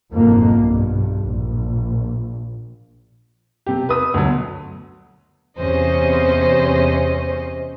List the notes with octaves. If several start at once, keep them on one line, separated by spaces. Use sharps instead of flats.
F#1 F2 G#2 B2 A#3
B1 G2
A#1
C3 G4
B4 D#6 E6
D2 B2 F#3
E2 C3 C#4 C5 D#5